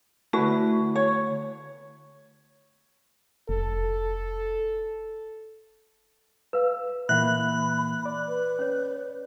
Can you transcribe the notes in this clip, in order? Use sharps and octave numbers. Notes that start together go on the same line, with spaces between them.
D3 A3 E4 F#4 B4
C#5
F1 A4
B4 F5 E6
A#2 E3 A#3 E5 F#5 B5 F#6
D5
B4
C#4 C#5